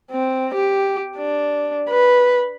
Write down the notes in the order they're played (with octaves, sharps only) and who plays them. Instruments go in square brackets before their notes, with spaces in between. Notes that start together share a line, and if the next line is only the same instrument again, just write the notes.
[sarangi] C4
G4
D4
B4